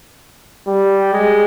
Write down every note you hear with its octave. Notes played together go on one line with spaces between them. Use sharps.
G3
G#3